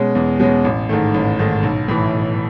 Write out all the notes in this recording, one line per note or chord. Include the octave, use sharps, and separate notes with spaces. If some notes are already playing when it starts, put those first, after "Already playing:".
Already playing: B2 G#3 C#4
E2
B2 G#3 C#4
A1
G#2 D#3 A3
A1
G#2 D#3 A3
B1
A2 E3
B1